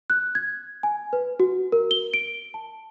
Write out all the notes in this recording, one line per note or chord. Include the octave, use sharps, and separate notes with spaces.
F#6
G#6
G#5
B4
F#4
A#4
G7
D7
A5